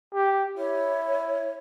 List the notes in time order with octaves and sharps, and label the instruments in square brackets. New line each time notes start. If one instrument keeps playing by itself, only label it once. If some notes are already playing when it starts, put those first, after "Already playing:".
[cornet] G4
[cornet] E4 [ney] C#5